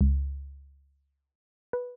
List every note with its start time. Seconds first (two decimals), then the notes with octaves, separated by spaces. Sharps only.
0.01 C#2
1.73 B4